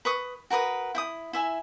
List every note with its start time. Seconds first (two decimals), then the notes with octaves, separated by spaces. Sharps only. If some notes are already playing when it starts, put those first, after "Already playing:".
0.05 B4 C#6 D#6
0.50 F#4 A#4 B4 D#6
0.95 E4 G5 D#6
1.33 E4 E5 G#5